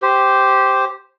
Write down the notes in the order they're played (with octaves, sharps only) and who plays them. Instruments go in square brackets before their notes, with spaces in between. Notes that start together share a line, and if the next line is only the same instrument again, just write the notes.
[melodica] G4 C5